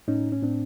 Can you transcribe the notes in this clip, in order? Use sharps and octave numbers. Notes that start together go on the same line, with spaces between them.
A2 C#4 D#4
C#4
A2 C4 D4